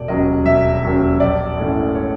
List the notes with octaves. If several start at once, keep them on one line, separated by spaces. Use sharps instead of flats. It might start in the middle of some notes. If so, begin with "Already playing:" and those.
Already playing: E1 D5
D#2 C#3 F#3 D#5
E1 E5
D#2 C#3 F#3
A#1 D5
G#2 E3 A3 C#4
C#5